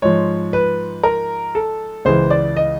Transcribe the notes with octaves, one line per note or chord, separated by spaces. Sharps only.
G#2 F3 C#5
B4
A#4
A4
C#2 C#3 E3 C5
D5
D#5